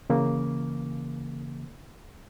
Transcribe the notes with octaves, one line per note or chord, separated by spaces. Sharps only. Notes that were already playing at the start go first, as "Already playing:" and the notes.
C#3 E3 A#3